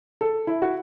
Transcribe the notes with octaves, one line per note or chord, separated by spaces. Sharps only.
A4
E4
F#4